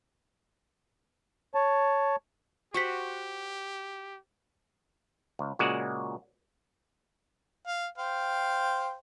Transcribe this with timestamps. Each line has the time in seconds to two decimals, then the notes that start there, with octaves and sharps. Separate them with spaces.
1.55 C#5 A5
2.74 F#4 G4 C5 F#5 C#6 B6
5.39 C#2
5.59 A#2 C#3 G#3 F#4 D5 F#5
7.67 F5
7.98 C5 F5 G5